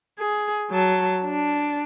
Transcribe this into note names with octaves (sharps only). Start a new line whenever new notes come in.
G#4
F#3 A5
D4